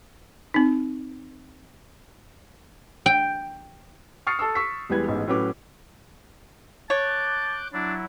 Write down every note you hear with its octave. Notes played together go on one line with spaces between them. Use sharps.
C4 D#4
G5
C#6 D#6 F6 A6 C7 C#7
A4 A5 C#6 E6
C#6 E6 B6
E2 E3 G3 G#3 B4 G#6
A1 G#2 B3
A2 F#3 C#4 B4 D6
C#5 A5 D6 F#6 G6
F#3 D4 E4